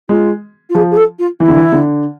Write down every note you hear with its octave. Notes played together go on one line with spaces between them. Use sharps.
G#3 F4
F4
F3 G#4
G#4
A4
F4
E3 E4
D3
E3
D3